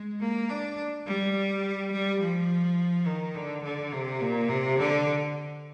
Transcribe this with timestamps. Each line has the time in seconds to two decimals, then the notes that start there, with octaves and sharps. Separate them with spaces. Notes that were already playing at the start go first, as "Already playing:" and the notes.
Already playing: G#3
0.20 A#3
0.49 D4
1.06 G3
1.92 G3
2.20 F3
3.07 D#3
3.35 D3
3.63 D3
3.92 C3
4.21 A#2
4.49 C3
4.78 D3